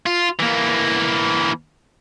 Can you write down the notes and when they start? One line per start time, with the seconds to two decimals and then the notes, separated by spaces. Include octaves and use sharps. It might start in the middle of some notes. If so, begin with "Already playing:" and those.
0.07 F4
0.39 E3 A#3